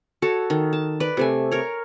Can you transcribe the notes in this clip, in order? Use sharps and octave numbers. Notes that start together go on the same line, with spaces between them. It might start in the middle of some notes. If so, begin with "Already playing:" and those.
F#4 A4 C#5 A5
D#3
A5
B4 D5
C3 A3 G#5
A#4 C#5